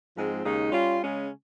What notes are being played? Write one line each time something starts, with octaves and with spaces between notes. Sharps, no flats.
G#2 F3 G#3 C4
D#2 C#3 G#3 D#4
G3 C#4 F4
C#3 G#3 C#4